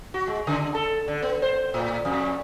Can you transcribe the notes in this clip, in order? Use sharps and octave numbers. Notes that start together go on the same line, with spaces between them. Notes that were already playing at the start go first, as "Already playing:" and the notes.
F#4
G#3
C#3
A4
D3
B3
C5
A2
F2